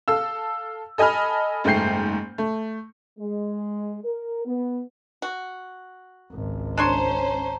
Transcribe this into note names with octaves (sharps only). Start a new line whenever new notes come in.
A4 F5 E6
A4 D#5 G#5 B5 F6
F#1 G#2 A3 G5 G6 C7
A3
G#3
A#4
B3
F#4
G#1 C#2
C#4 D4 C5 C#5 A5 A#5 C6